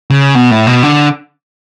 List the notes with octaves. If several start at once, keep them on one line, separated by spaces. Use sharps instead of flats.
C#3
B2
A2
B2
D3